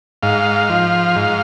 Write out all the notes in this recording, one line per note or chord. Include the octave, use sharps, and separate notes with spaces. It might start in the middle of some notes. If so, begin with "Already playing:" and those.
G#2 F5
F3
G#2